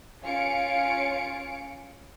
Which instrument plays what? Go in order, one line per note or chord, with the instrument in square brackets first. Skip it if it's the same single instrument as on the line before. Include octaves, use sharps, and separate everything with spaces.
[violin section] C#4 F4 F5 G#5 C#7 D7